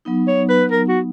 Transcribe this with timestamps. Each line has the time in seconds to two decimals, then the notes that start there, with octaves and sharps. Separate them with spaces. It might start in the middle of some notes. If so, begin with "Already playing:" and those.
0.05 F#3 B3 D#4
0.28 C#5
0.49 B4
0.71 A#4
0.88 F#4